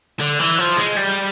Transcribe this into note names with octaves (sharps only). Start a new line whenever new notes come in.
D3
E3
F3
G#3
G3